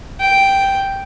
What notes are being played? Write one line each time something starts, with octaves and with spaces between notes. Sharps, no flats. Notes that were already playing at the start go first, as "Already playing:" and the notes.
G5